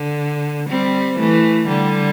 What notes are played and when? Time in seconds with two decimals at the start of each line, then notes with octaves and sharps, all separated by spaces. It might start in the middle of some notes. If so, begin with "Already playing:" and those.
Already playing: D3
0.70 G3 C4
1.19 E3 A3
1.68 D3 G3